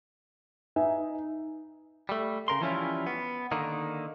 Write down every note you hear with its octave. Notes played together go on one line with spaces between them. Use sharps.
D#4 B4 E5 G#5
G3 A3
C#3 A#4 C6
E3 F3 G3 C#4 E4 F4
B3
D3 D#3 A#3 D#4